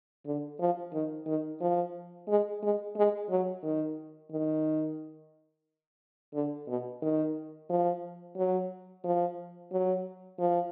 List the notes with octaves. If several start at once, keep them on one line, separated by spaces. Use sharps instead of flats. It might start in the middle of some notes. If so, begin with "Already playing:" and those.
D3
F3
D#3
D#3
F3
G#3
G#3
G#3
F#3
D#3
D#3
D3
B2
D#3
F3
F#3
F3
F#3
F3